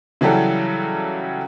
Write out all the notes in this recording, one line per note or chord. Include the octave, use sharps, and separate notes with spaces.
C#3 E3 F#3 G3 F#4 A4